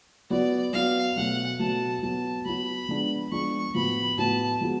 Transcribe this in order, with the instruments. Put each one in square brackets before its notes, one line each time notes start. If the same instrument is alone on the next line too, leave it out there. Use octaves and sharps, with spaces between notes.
[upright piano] F#3 B3 F#4 [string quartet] D5
[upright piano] F#3 B3 F#4 [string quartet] F5
[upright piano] B2 F#3 A3 [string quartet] F#5
[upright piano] B2 F#3 A3 [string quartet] A5
[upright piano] F#3 B3 F#4 [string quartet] A5
[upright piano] F#3 B3 F#4 [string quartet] B5
[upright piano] F3 G#3 B3 D4
[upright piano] F3 G#3 B3 D4 [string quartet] C#6
[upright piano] A2 F3 B3 F#4 [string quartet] B5
[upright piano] A2 F3 B3 F#4 [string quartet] A5
[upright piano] F3 G#3 B3 F#4